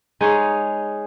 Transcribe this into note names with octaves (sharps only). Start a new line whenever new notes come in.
G#3 D#4 G#4 C#5